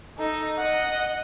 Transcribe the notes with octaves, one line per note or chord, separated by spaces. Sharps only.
D#4 A4
D#5 F#5